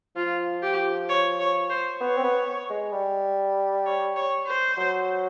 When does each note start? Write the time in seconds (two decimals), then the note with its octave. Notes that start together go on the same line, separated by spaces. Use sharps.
0.16 F3 F4
0.62 G4
1.09 C#5
1.39 C#5
1.70 C5
2.01 B3 C#5
2.17 C4
2.24 B3
2.70 G#3
2.93 G3
3.86 C#5
4.16 C#5
4.47 C5
4.77 F#3